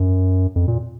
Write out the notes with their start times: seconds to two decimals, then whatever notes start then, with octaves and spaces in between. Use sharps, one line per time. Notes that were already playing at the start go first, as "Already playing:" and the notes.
Already playing: F#2
0.56 F2
0.68 A#2